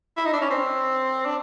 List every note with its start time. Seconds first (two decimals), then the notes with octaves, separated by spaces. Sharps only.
0.17 E4
0.25 D#4
0.33 D4
0.41 C#4
0.50 C4
1.26 D4